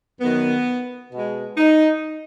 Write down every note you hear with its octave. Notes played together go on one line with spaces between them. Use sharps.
F#2 D#3 F#3 B3
B2 G#3
D#4